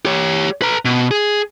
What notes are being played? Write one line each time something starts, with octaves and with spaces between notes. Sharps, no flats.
G4 C#5
B4 A#5
B2
G#4